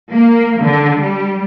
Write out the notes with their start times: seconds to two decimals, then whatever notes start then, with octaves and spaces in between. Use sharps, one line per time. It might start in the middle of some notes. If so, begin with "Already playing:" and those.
0.10 A#3
0.60 D3
0.98 G3